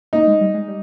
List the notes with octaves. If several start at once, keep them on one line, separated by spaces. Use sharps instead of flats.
A#3 D#4
G#3
G3
G#3
G3